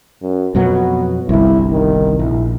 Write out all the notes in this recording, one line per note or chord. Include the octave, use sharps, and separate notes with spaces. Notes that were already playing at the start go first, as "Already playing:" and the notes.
F#2
F2 B2 F#3 B3
G1 C2 E4
D#3
A#1 E4